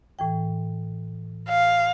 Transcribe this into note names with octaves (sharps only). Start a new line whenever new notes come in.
A2 E3 G5
F5